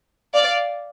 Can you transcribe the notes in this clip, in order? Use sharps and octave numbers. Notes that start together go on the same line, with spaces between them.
D5 F5